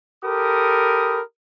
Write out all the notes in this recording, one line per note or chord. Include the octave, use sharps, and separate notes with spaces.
G4 A4 A#4 B5 D#6